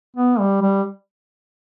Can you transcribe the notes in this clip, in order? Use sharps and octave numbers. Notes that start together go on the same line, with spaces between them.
B3
G3
G3